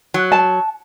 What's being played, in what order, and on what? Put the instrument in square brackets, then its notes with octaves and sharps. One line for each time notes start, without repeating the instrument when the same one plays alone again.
[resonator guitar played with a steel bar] F#3
[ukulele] A5